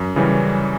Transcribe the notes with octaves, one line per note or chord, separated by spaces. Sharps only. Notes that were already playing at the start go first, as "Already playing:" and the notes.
Already playing: F#2
C#3 E3 G3 C#4